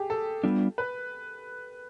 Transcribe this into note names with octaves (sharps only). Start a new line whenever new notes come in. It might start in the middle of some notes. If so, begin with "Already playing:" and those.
Already playing: G4 G#4
A4
G3 B3 D4 F4
B4